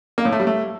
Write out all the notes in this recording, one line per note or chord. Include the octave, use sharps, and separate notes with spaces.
A#3
A2
A3
G3
A3